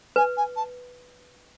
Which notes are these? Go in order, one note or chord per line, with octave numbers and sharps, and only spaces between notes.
B4 G#5
G#5
A5